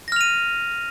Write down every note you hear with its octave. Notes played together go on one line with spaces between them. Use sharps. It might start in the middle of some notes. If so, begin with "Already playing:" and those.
F6 A#6 D#7 F7